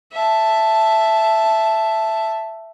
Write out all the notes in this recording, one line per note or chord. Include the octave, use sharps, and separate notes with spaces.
E5 A5